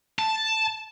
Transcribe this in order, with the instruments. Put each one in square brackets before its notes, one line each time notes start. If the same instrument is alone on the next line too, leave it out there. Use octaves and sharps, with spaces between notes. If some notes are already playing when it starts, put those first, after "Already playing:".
[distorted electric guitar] A5